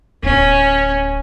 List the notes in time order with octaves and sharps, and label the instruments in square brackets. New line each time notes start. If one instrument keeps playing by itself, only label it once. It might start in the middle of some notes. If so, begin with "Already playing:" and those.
[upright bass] D1 [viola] C#4